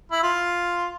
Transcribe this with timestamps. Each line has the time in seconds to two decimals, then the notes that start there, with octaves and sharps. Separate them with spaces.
0.12 E4
0.23 F4